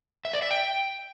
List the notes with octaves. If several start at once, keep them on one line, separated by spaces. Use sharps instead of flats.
E5
D5
E5
G5